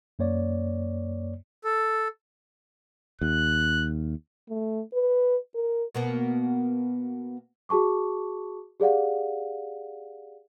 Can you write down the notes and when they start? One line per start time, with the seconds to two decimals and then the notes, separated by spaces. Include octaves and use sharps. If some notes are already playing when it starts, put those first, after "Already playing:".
0.19 F#2 A#3 C#5 D5
1.64 A4
3.21 D#2 F#6
4.49 A3
4.93 B4
5.55 A#4
5.95 B2 A#3 B3
7.69 F#4 G#4 A5 C#6 D6
8.80 G4 G#4 D5 F5 F#5